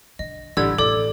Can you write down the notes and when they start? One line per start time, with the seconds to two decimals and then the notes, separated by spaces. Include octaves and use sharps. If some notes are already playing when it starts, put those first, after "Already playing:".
0.19 D3 D#5
0.57 A1 D3 G3 D4 E6 G#6
0.78 A1 E2 A4 D5 D6